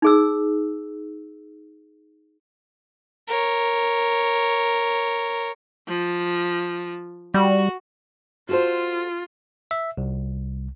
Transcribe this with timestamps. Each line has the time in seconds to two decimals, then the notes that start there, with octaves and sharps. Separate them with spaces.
0.02 D#4 G#4 E6
3.28 A#4 C#5
5.88 F3
7.34 G3 F#4
8.49 F4 F#4 A4 C5
9.71 E5
9.97 C2